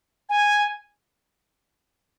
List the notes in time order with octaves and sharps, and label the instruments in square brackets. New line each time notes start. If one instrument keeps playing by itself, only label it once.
[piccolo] G#5